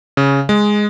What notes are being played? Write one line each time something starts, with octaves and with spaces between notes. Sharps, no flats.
C#3
G#3